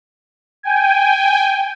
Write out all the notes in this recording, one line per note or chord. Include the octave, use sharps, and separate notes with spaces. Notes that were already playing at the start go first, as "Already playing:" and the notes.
G5 G#5